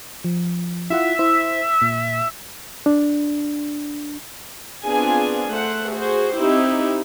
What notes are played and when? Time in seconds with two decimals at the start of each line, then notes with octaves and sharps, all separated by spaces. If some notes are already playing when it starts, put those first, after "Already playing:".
0.24 F3
0.90 E4 F4 E5 F#5
1.19 E4 C5
1.82 A#2
2.86 D4
4.85 B3 C4 D4 F4 G#4 G#5
5.49 A3 C5 F#5
5.90 F#4 G#4 C5
6.35 C4 D#4 E4 G4